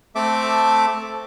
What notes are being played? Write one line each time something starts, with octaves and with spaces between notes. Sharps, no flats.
A3 C4 A4 E5 D6